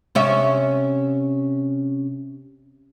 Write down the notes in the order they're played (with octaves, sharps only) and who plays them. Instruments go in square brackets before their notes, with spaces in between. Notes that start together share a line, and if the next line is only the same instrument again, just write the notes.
[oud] C3 C#4 E5